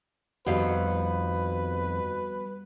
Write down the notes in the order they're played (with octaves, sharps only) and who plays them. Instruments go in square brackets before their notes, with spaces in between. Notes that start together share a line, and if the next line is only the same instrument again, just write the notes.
[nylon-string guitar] F2 D#3 F5 [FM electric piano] G3 B3 F#4 [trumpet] B4